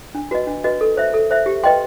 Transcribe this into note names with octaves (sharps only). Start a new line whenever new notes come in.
D4
F#4 B4 D#5
D4
F#4 B4 D#5
A4
C5 E5
A4
C5 E5
G4
B4 D#5 G5 C6